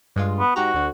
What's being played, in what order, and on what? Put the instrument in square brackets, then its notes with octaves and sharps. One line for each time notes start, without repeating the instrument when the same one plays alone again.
[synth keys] G2 G#3 F4
[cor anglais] B3
[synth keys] G#2 G4 A#5 [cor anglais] F#4
[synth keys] D2 D3